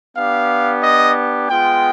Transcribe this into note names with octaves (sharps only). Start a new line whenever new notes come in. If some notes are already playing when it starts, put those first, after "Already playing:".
B3 D4 G4 F5
D#5
G#3 B3 F4 G5